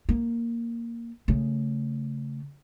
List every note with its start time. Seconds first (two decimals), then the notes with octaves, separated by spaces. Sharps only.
0.09 A#3
1.28 C#3 A3